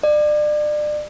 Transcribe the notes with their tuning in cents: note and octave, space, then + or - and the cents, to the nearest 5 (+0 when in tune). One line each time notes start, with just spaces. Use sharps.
D5 +30